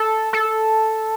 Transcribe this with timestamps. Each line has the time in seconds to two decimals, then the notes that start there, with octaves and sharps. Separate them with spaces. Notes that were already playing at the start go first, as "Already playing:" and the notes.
Already playing: A4
0.33 A4